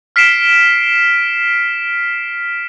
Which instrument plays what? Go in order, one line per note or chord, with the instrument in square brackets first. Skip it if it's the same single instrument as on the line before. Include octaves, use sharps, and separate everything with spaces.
[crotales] F6 B6 C7 D7 E7